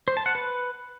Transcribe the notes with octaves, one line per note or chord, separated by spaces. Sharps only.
C5
A5
F#5
B4